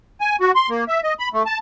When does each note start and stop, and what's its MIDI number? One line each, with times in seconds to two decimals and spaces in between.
0.21 0.36 80
0.41 0.51 66
0.55 0.69 84
0.69 0.84 58
0.88 1.00 76
1.04 1.14 75
1.19 1.29 83
1.34 1.43 57
1.46 1.58 81